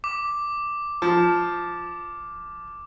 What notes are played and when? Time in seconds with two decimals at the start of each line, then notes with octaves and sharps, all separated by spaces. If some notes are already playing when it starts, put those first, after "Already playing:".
0.04 D6
1.02 F3